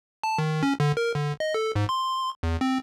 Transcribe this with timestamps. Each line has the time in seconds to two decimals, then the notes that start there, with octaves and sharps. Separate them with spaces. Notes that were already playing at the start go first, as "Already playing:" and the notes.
0.23 A5
0.38 D#3
0.63 C#4
0.80 D3
0.97 A#4
1.15 D3
1.40 D#5
1.54 A4
1.76 G#2
1.89 C6
2.43 E2
2.61 C4